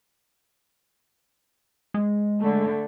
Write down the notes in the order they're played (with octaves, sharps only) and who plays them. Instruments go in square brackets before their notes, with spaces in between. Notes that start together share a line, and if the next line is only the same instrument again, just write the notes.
[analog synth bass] G#3
[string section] D3 A3